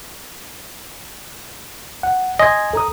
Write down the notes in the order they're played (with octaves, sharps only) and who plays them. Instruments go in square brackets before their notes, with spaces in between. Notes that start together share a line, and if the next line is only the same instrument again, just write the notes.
[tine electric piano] F#5
[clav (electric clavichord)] D#5 [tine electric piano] G#5 C6 G#6
[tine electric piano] A4 A#5 D#6